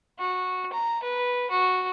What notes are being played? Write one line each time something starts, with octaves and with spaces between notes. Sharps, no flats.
F#4
A#5
B4
F#4